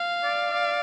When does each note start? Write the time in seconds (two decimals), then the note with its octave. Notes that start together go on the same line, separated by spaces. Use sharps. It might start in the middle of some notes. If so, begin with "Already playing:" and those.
Already playing: F5
0.23 D5
0.53 D5